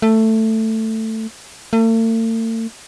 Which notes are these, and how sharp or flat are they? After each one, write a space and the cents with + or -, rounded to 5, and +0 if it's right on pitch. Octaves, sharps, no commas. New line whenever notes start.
A3 +10
A3 +45